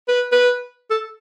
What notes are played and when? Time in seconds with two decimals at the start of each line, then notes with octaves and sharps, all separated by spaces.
0.08 B4
0.32 B4
0.90 A4